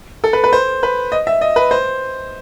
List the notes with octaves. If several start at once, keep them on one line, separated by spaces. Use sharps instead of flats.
A4
B4
B4
C5
B4
D#5
E5
D#5
B4
C5